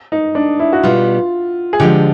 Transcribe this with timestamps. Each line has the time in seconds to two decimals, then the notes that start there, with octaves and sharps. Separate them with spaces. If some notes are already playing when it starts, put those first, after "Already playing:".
0.12 D#4
0.35 D4
0.59 E4
0.73 F#4
0.83 B2 G3 B3 F4
1.73 G#4
1.80 D3 F3 G#3 G4